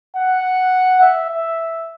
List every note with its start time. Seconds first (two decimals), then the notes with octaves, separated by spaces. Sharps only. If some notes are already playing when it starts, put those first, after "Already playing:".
0.16 F#5
1.01 E5
1.29 E5